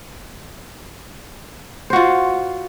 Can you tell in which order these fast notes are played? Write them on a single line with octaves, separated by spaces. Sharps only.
C5 F#4 F4